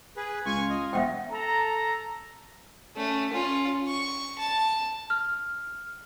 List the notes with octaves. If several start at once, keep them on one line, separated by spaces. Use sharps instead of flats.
G#4 B4
C#2 F4 G#5 C#6
D#5
E1 C4 E5 F#5 G5
A4 A#5
A3 C#4
C#4 F4
C#6
A5
F6